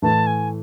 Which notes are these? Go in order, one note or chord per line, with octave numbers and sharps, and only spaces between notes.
A2 E3 A3 A5
G#5